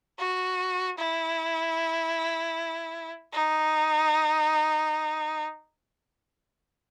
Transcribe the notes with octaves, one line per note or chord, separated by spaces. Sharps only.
F#4
E4
D#4